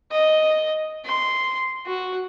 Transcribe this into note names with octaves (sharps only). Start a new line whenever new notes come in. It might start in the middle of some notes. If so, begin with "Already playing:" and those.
D#5
C6
F#4